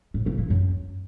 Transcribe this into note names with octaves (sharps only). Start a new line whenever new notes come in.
A2
A#2
E3
F#2